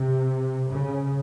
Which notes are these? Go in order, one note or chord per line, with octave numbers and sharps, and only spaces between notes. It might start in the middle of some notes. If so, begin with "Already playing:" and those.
Already playing: C3
C#3